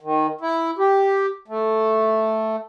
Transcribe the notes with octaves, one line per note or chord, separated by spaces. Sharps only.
D#3
E4
G4
A3